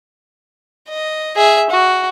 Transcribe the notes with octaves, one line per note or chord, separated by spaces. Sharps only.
D#5
G#4 E5
F#4